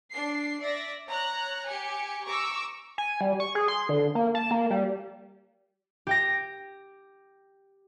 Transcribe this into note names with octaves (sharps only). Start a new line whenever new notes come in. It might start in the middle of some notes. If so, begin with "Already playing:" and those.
D4 C7
D5 E5 A#6
C#5 A#5 F#6
G4 G#5 C#7
A#5 C#6 D6 E6
G#5
G3
C#6
G#4
C6
D3
A#3
A5
A#3
G3
G4 G5 A#6